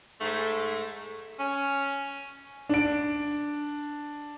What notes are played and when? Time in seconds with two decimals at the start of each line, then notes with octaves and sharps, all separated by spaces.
0.21 G#2 A3
1.39 C#4
2.69 D4 D7